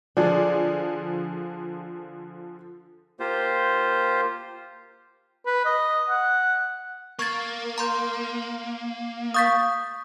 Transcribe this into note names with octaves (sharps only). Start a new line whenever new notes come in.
D3 F3 D4 G#4
A#3 F4 G4 C5
B4
D#5
F#5
A#3 C#6 G#6 A6
A#5 C6 G6
F5 C#6 D#6 G6 A6 B6